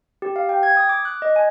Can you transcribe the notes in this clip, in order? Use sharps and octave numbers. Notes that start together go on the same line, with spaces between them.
G4
F5
G5
G#6
D#6
D6
F#6
D#5
G#5